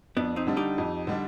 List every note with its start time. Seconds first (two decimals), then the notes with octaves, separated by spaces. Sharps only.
0.17 F2 B3 D4
0.36 C4 D#4
0.47 D3 G3 D4
0.57 D#4 G4
0.78 F2
1.07 D3 G3 D4